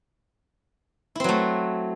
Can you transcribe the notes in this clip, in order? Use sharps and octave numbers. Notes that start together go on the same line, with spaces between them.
F#3 A3 C4 E4